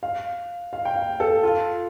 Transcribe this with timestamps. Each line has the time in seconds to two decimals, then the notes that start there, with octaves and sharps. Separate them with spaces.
0.03 F5
0.73 F5
0.85 G5
0.96 F5
1.20 A4
1.43 F4